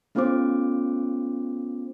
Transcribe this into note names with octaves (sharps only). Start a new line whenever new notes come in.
A3 B3 C#4 F4 C5 D6